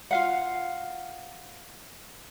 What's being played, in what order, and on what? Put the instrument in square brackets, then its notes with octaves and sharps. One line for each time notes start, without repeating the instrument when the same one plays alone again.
[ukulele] F4 F5 F#5